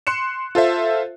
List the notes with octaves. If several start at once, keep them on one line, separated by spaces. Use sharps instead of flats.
C6 F#6 C#7 E7
F4 A4 C5 E5